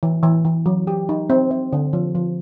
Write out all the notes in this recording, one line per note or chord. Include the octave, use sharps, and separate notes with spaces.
E3
E3
E3
F#3
G4
D#4
C4
C4
D3
F3
F3